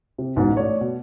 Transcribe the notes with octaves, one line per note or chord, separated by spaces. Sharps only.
C3
A1 G#2 B2
A3 C#5 D5
B2